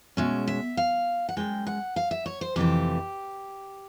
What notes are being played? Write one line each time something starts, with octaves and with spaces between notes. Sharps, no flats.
B2 G#3 C#4 E5
E5
F5
F#5
F#2 D#3 G#3 G5
F#5
F5
E5
C#5
C5
F2 C3 E3 A3 G4